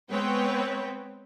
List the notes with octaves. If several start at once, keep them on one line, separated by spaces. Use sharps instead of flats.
G#3 B3 C4 B4 C#5 G5